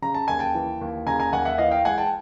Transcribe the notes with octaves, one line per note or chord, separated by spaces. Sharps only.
C#3 A#5
A5
D#2 G#5
G5 A5
E3
D#2
C#3 G#5 A#5
G#5 A#5
D#2 F#5 G#5
E5 F#5
E3 D#5 F5
F5 G5
G#3 F#5 G#5
G5 A5